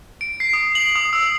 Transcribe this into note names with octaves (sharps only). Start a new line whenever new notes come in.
D7
C7
D#6
F#7
D#6
E6